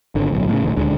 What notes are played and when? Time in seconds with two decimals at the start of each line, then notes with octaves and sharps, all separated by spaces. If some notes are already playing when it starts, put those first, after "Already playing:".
0.15 G#1 D3
0.30 D1 B1
0.49 A2 C#3
0.63 D#1 A1 D2
0.76 D#1 D2 D3 G#3